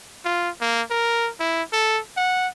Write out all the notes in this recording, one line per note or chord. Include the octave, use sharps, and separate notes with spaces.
F4
A#3
A#4
E4
A4
F#5